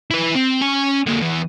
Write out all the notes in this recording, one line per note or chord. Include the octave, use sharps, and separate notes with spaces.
E4 B4
C4
C#4 G#5
D3 A#3
E2 E3